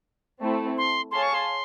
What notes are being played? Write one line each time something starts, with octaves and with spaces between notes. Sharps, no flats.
A3 C4 E4 A4
C6
G#4 C#5 F5 A5 C6
C#6
C6